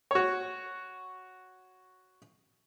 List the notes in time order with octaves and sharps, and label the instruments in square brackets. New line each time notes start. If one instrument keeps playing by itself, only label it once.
[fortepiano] F#4 C#5